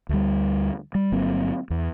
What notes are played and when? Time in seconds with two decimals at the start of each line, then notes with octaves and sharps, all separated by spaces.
0.09 D2 G3
0.95 G3
1.12 G1 F#3 A#3 C4
1.70 E2